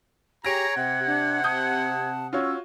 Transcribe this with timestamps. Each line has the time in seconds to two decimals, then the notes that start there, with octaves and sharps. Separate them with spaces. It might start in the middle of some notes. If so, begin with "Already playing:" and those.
0.45 G4 G#4 C#5 A#5 G#6 A#6 D7
0.76 C3 G4 F#5
1.07 D4
1.44 A5 D#6 G6
2.33 C#4 F4 F#4 C#5 E6